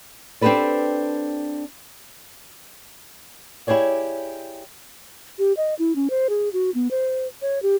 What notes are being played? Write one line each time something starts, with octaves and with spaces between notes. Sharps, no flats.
C4 D4 G4 A4 B4 D5
E4 G4 G#4 C#5 D5
G4
D#5
E4
C#4
C5
G#4
F#4
B3
C5
C#5
G4